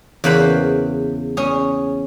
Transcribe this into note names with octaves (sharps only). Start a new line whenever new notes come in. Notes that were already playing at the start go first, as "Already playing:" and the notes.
E2 C#3 A#3 B4 C5 B5
C#4 G#4